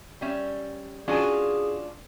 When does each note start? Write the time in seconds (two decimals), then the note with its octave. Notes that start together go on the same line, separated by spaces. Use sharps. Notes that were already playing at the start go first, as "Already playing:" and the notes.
0.21 G3 C#4 E5
1.08 C#4 D4 F4 F#4 G#4 G#5